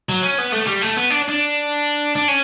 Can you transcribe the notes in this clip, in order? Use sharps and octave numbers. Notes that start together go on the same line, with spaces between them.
F#3
C#4
B3
A3
G3
A3
B3
D4
D4
D4
C#4